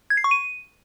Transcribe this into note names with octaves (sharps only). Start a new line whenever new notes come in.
G#6
C7
C#6
D#7